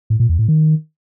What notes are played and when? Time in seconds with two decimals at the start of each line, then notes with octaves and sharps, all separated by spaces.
0.10 A2
0.20 A#2
0.29 E2
0.39 A2
0.48 D#3